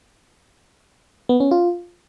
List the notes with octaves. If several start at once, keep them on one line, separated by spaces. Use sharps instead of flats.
B3
C#4
F4